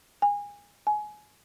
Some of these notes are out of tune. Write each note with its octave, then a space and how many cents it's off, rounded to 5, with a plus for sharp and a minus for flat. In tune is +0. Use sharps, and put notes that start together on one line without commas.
G#5 -25
G#5 +20